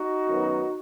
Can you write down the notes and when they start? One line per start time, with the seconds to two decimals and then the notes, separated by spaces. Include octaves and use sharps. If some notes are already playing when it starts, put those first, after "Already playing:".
Already playing: D#4 F#4
0.27 F#2 D#3 F#3 B3